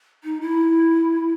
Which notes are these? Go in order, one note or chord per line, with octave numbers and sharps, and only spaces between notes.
D#4
E4